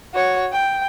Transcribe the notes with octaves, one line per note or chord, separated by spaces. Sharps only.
F#4 C#5
G5